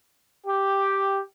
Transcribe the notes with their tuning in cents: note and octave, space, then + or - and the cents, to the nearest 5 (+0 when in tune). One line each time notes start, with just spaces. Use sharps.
G4 +0